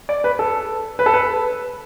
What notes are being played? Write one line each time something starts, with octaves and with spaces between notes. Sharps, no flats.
D5
B4
A4
B4
A4
B4